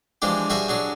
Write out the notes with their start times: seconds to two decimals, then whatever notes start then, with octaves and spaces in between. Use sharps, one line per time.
0.22 E3 F3 G#3 D4 G4
0.50 G3 F#4 G#4 E5 G#5
0.68 F#3 D4 G#4